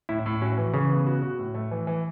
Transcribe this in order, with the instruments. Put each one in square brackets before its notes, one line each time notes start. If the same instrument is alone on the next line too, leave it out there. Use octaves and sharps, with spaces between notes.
[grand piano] A2 [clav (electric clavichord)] E4
[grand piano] A2
[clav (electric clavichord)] C#4 [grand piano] F#4
[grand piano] E3
[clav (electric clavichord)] C#3 [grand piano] E3
[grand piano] B3
F#4
F#4
A2
A3
E3
E3